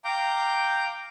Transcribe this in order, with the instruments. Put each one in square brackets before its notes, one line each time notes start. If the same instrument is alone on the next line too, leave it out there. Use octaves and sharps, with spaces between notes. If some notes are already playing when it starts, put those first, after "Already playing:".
[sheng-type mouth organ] F5 G5 A#5 D6 G6